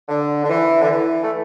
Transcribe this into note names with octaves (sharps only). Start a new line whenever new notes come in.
D3
D3
E3
D3
E3
A3